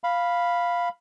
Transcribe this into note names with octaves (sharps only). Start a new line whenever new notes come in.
F5 B5